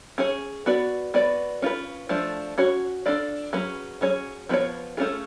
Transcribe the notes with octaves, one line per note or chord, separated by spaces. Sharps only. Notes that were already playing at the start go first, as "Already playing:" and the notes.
C#4 G#4 C#5
B3 F#4 B4 D5
B3 F#4 B4 D5
C#4 F4 B4
F3 A3 D4 F4
C#4 F#4 C#5
D4 F4 A4 D5
F#3 C#4 G#4 B4
F#3 C#4 G#4 C#5
F3 B3 F4 A4 C#5
A3 C#4 F4 G#4